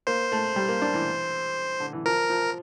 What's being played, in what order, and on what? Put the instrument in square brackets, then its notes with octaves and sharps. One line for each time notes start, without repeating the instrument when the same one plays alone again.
[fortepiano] A#3 [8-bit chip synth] C5
[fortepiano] A3
G3
A#3
D4
E3
D3
E3
[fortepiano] F3 [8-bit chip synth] A#4
[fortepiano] F3